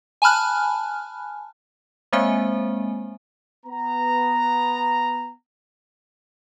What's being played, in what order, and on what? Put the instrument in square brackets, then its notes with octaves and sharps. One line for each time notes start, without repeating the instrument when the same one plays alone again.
[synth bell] G#5 A5 B5 F6 F#6
G#3 A#3 C4 C5 E5 G#5
[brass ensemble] B3 A#5